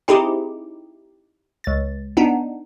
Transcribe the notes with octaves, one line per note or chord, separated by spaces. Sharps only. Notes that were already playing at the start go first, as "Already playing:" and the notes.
C4 D#4 E4 G4 G#4
C#2 A6
B3 D4 D#4